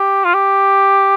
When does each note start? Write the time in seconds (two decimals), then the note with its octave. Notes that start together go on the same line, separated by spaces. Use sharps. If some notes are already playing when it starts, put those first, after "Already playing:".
Already playing: G4
0.25 F4
0.34 G4